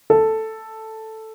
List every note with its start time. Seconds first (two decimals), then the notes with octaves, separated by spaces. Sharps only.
0.10 A4